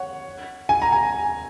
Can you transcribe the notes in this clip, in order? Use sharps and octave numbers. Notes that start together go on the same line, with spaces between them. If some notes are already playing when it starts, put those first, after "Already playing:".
Already playing: C#5 F#5
G#5
A#5
G#5